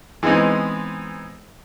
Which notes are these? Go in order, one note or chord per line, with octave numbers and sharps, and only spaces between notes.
E3 G#3 B3 C4 D#4